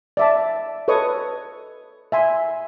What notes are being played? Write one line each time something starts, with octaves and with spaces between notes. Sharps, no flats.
D5 E5 A5
A4 B4 C#5 D#5 C#6 D#6
E5 G#5 C6